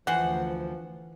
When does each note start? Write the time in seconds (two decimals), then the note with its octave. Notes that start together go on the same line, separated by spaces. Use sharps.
0.07 D2 E3 F3 C5 F#5